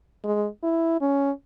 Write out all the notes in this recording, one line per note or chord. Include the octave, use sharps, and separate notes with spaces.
G#3
E4
C#4